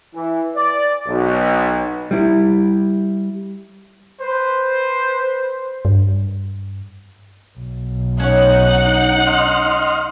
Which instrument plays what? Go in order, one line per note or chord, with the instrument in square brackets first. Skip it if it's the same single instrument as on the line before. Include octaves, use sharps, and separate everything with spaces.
[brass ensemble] E3
D5
B1
[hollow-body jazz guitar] G3 E4
[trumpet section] B4 C5
[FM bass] G2
[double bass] B1
[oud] C#4 C#5 [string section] D#4 F#5 F#6
[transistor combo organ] D#5 C6 F6